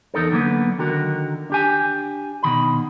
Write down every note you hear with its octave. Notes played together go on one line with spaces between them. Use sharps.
E2 D#4 A4 A#4
D3 F#3 A#3 B3
D3 D#3 F#4 A#4
D4 G4 G#5
B2 D#3 B5